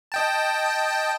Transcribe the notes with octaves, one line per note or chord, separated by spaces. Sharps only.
D#5 G5 A5